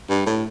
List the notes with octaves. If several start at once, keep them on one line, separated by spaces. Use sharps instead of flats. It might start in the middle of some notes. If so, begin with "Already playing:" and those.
G2
A2